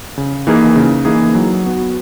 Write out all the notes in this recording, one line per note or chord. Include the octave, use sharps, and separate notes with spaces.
C#3
E3 A#3 D#4 G#4
C#3
E3 A#3 D#4 G#4
F#3
B3 F#4